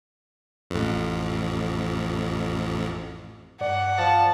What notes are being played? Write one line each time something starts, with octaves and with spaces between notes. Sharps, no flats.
A1 F2
G2 D5 F#5
F3 A5